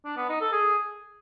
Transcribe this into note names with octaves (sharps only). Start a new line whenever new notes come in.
D4
B3
D#4
A4
G#4